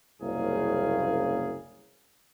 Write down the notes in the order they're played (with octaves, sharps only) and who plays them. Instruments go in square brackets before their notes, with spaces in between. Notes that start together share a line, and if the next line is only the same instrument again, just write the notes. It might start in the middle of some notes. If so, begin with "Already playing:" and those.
[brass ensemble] F#1 C2 G#2 C#3 A#3 G#4